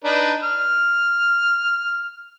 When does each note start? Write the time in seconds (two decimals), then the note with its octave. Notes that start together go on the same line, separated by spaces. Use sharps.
0.04 D4 D#4 B4
0.43 F6